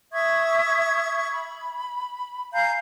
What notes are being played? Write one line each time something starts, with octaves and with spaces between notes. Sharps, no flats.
E5 C#6 D#6 G#6
B5
F5 G#5 A#5 G6